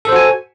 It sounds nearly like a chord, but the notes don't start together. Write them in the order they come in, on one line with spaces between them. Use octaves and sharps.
A4 C5 F#4 G#5